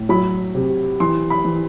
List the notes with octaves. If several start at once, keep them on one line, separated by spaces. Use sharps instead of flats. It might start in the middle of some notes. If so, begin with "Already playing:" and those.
Already playing: A2
F#3 B5
C3
E3 C6
B5
E3